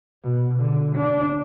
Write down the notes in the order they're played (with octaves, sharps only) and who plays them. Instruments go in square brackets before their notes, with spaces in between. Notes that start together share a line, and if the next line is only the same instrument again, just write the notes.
[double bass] B2
D3
D4